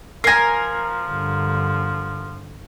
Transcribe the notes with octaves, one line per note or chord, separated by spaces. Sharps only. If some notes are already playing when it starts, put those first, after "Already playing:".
F3 A#4 G#5 A#6 C7
G2 D3